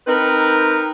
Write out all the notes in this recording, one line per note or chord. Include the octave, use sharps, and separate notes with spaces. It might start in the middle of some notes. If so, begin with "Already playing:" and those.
C4 D#4 A#4 B4